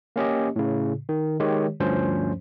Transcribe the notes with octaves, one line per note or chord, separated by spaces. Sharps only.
A#3 C#4 G4 D#5
A2 C#3
D#3
D#3 G#3 G4 C#5
D2 G2 F3 C#4 C5